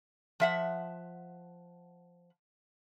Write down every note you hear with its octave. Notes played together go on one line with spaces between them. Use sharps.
F3 E5 F#5